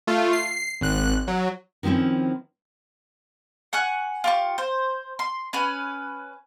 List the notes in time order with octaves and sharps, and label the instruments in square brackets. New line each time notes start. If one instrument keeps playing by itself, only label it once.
[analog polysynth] A3 F4
C7
G#1 F#6
F#3
[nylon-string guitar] D#3 F3 C4 C#4 E4
[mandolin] F#5 G#5 C#6 F#6
F4 G4 C#6
C5
C6
C#4 B4 G#5